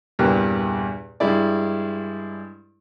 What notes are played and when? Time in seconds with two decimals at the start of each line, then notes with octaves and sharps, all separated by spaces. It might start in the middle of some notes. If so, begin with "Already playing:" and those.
0.19 E2 G2 A#2 G4 B4 F#6
1.20 G2 G#3 E4 D5